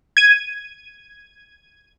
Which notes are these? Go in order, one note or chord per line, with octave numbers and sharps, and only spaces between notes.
G#6 D#7